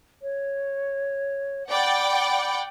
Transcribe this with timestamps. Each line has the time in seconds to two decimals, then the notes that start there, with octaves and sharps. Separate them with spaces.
0.22 C#5
1.71 D5 F#5 G5 B5